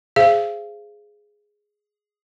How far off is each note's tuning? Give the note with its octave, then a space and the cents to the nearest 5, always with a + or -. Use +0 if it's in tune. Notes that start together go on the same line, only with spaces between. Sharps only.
G#4 +0 C5 +0 F5 -35